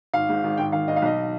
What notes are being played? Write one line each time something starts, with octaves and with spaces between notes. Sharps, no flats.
G#1 F5
G#2
G#1
G#1 G5
D#3 F5
G#1 D#5
F5
B1 D#5